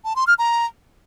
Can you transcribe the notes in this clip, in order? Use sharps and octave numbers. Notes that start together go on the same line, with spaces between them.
A5
C6
F6
A#5